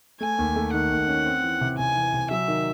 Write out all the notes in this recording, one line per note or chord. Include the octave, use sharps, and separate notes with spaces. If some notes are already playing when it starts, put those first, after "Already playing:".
A3 G#5
D#2
A3
D#3 F#5
D#2
C#4
C4
E3
C3
C3 G#5
E3
C3
F#3 E5
D#3